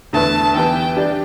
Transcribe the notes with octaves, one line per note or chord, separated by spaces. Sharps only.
E2 D3 A3 E4 B4 A5
E3 B3 G4 B4 G5
G3 D4 G4 D5